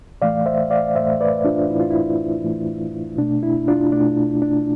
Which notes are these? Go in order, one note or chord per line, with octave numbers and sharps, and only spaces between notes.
A2 E3 A3 D5 F5
C5 E5
D5 F5
A2 E3 A3 C5 E5
B4 D5
D4 F4
A2 E3 A3 E4
F4
E4
A2 E3 A3
B2 A3 D4
E4
D4 F4
B2 A3 D4
D4